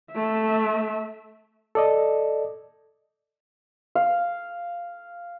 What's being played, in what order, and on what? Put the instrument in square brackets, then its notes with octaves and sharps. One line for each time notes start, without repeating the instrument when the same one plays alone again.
[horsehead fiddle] A3 E5
[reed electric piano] A4 D5 D#5
[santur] F5